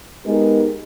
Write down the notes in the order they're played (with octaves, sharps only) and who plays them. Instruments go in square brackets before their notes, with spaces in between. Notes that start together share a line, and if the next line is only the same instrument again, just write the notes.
[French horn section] G#3 B3 D#4 G4 A#4